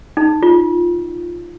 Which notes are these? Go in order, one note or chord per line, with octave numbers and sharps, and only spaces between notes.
D#4
F4